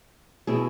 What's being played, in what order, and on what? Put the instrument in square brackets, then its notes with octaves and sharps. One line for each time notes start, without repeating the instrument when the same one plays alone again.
[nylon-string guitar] B2 E4 G#4